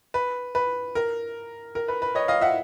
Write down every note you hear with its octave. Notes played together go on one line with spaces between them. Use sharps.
B4
B4
A#4
A#4
B4
B4
C#5 D#5
D#5 F5
E5 F#5